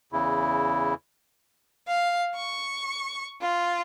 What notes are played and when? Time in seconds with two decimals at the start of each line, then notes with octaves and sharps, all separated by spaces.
0.12 E2 C#3 E4
1.87 F5
2.35 C#6
3.41 F4